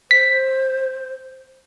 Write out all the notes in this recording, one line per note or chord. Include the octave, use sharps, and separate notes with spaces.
C5 B6